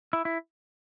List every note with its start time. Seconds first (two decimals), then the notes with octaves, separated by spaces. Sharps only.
0.13 E4
0.25 E4